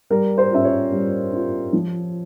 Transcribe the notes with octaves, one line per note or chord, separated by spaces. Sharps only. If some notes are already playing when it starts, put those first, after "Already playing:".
G3 A#4
C5
C#4 F4 E5
C#5
G3
C#4 F4
F3